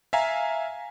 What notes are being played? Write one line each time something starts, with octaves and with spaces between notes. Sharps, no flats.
E5 F5 G#5 A#5